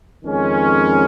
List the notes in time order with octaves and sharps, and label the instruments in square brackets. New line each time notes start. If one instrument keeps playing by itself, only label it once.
[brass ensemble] F2 D#3 G#3 C#4